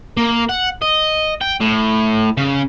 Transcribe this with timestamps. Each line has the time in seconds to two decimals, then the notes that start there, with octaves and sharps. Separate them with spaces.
0.17 A#3
0.49 F#5
0.82 D#5
1.41 G5
1.61 A2
2.37 C#3